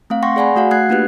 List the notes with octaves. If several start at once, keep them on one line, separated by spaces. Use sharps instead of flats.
A3 C4 F5
F#5 G5 C6 C#6 A#6
G#4 D5 F#5 G#5 B5
A3 F#4 F5 F#5
A3 F#6 G#6 C7
A#3 D4 F4 G4 B4 F#6